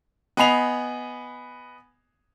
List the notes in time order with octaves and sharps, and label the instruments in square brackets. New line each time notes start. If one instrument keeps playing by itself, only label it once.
[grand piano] B3 D#5 G#5 B5 C7 F7